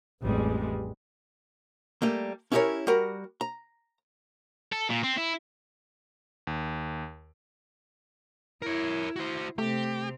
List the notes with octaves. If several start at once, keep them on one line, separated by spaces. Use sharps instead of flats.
A1 F2 G3 G#3
G3 A3 A#3
C#4 E4 G4 G#4 A#4 C#5
G3 F#4 A#4
A#5
A4
A#2
C4
E4
D#2
E4 A#4 C#5
F#4 C5
C3 A3 C4 G4